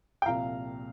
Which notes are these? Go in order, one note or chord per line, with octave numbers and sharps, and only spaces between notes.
G5
C2 A#2 F3 F5 A#5